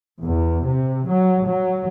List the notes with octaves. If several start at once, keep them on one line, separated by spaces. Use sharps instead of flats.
E2
C3
F#3
F#3